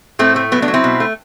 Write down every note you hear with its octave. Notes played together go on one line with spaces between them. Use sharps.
A2 A3 C4
A3
F#3 B3
B3 D4
F#3
C4 E4
B2
A3